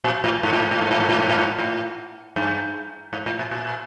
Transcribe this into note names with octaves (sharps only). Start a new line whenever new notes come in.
A#2
A2
G#2
A2
G#2
A2
G#2
A2
G#2
A2
G#2
A2
G#2
A2
G2
G#2
A2
A#2
A#2